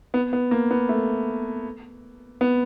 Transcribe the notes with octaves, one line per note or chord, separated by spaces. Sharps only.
B3
B3
A#3
B3
A3
B3